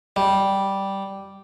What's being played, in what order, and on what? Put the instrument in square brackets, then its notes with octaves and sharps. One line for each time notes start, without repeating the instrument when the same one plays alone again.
[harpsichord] G3